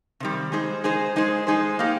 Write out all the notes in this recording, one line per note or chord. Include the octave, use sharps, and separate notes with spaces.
C3 D#3 G3
G#3 D#4 G#4 C5
G#3 D#4 G#4 C5
G#3 D#4 G#4 C5
G#3 D#4 G#4 C5
A#3 D#4 G4